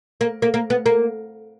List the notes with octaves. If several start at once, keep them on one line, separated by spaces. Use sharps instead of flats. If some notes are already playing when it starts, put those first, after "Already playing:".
A#3
A#3
A#3
B3
A#3